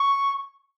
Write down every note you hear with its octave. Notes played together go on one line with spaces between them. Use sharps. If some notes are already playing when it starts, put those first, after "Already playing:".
Already playing: C#6